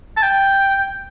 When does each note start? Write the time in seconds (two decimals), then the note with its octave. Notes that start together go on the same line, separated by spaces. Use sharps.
0.17 A5
0.23 G5